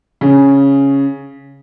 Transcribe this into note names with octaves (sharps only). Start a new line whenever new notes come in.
C#3